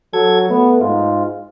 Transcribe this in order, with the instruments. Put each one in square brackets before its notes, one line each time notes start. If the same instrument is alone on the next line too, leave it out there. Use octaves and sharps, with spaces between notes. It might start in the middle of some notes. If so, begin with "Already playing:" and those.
[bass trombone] F#3 [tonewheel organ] A4 G#6
[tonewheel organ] A3 [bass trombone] B3
[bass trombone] G#2 [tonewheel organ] F4